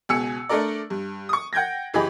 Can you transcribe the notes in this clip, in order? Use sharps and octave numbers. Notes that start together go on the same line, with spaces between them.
C#2 B2 G#5 E6 C#7
A3 D4 A4 A#4 D5
G2
C#6 D#6
F#5 G5 G6 G#6 A#6
F#1 E3 G4 G#4 D#5 B5